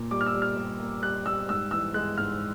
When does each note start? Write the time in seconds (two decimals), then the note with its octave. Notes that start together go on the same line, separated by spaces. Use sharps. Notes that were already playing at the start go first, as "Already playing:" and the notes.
Already playing: A#2 A#3
0.11 G3 D6
0.21 F6
0.26 E6
0.34 G3
0.42 F6
0.57 G3
0.80 A#3
1.03 G3 F#6
1.26 G3 E6
1.48 G#2 E6
1.71 E3 E6
1.94 G#3 F#6
2.17 G#2 F6